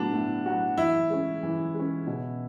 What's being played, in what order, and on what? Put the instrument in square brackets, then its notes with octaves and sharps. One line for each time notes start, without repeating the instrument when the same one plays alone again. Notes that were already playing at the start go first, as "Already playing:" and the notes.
Already playing: [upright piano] A2 F#3 B3 F#4 [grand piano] D4
[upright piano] A2
F#3 B3 F#4
[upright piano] E3 [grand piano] E4
[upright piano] G#3 C#4
E3
G#3 C#4
B2